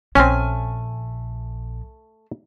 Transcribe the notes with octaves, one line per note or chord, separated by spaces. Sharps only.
A#1 A3 C4 C#4 G#5 F6